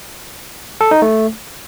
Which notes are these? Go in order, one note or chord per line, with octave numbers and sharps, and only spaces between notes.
A4
D#4
A3